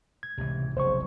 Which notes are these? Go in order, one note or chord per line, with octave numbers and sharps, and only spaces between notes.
G#6
C#2 A2 C3 E3
F1 B1 C#3 C5 C#6